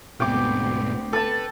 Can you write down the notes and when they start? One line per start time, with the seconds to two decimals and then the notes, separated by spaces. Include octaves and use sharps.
0.20 D2 G#2 B2 B3 C4 G5 D6
1.13 A4 B4 A5